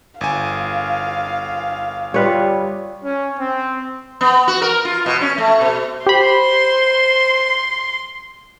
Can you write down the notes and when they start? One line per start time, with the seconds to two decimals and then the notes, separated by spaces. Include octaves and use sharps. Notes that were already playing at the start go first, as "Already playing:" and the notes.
0.21 G1 F5 G#5
2.14 G3 F4 B4 C#5
3.03 C#4
3.38 C4
4.21 B3
4.48 F#4
4.62 A#4
4.85 F4
5.06 B2
5.21 C#4
5.38 A3
5.61 B2
6.06 G4 C5 B5 C6